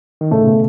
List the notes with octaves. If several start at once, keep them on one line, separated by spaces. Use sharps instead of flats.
D#3
A2 C#3 A3
B2